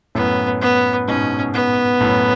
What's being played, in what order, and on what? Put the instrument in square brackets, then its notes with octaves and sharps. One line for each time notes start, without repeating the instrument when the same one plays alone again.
[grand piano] F#2 A2 [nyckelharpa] B3
[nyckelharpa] B3
[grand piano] G#2 B2 [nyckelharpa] C#4
[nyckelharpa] B3
[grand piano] F#2 A2